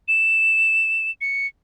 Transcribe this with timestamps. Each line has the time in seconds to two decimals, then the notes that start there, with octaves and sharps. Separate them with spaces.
0.08 E7
1.21 C#7